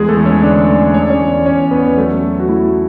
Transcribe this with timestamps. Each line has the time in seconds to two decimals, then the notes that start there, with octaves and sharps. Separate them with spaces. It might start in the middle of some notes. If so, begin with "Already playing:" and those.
Already playing: E2 G#3 G#4
0.08 A3 A4
0.17 E2
0.25 C#4 C#5
0.43 D3 D4 D5
0.68 A3
0.94 A3 C#5
1.02 D5
1.10 C#4 C#5
1.20 E2
1.46 E2 C#4 C#5
1.71 E2 B3 B4
1.97 F#3 A3 A4
2.23 F#3
2.40 F#4
2.49 A3 E4